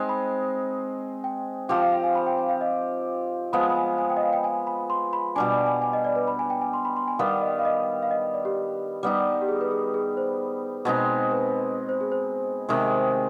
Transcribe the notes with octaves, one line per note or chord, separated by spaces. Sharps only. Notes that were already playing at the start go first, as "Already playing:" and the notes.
Already playing: G#3 C4 D#4
B5
G5
F3 C4 G4 G5
F5
F5
G#5
B5
G5
G5
F5
D#5
F3 G#3 B3 B5
B5
G#5
G#5
G5
D#5
F5
G5
G#5
B5
C6
B5
B2 G3 D4 G#5
G#5
G#5
G#5
D#5
D5
B4
B5
G#5
G5
G#5
C6
B5
C6
G#5
D#3 G3 B3 F5
D#5
F5
D#5
F5
D#5
D5
G4
G3 B3 D#4
G4
G#4
B4
G#4
G#4
C5
B2 G#3 C4 D#4
B4
C5
G#4
C5
C3 D#3 G#3